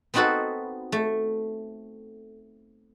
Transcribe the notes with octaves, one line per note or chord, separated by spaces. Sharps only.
B3 C4 D#4 F#4 A4 B4
A3